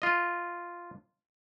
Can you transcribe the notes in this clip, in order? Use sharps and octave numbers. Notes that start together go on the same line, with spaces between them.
F4 D#5